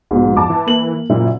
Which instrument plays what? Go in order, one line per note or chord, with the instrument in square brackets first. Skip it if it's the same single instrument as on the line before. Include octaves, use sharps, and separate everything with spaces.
[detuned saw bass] A#1 [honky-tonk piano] G#2 B2
[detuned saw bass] F2 [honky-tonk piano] A5 D6
[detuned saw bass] E3
[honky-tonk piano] A#3 F#7
[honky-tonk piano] F#1 E4 [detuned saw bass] A#2